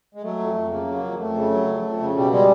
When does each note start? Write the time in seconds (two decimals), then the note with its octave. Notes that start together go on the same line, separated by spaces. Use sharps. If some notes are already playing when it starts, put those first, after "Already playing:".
0.15 G#3
0.23 F#3 A3
0.39 F2
0.55 F2
0.71 C#3 A#3
0.87 F#3
1.03 F2
1.19 F2 A3
1.35 C#3
1.51 F#3
1.67 F2
1.83 F2
2.00 C#3
2.16 B2 G3
2.31 G3 G#3